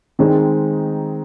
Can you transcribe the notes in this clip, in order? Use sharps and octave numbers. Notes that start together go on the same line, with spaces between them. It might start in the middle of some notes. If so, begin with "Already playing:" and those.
D#3 G#3 C4 D#4